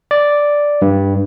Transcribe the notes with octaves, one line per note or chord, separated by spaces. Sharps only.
D5
G2